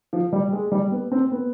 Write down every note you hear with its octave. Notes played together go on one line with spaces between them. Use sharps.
F3
G3
G#3
G3
B3
C4
B3